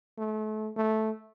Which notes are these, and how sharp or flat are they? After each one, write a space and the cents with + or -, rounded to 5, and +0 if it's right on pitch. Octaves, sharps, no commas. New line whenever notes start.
A3 -30
A3 -10